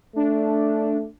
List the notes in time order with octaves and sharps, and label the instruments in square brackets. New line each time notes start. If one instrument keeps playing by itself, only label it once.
[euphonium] A3 [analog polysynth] D4